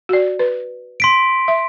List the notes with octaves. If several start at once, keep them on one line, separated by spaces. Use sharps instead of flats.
F#4 D5
B4
C6 B6 D7
E5